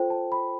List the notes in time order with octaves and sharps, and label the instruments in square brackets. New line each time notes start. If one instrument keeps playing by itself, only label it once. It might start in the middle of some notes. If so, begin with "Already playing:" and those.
Already playing: [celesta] F4 A4 C5 G5
A5
B5